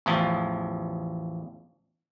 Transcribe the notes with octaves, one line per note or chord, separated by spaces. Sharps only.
A1 E2 F3